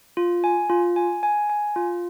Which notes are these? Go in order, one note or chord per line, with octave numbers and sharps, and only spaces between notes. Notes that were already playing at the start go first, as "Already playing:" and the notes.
F4
G#5
F4
G#5
G#5
G#5
F4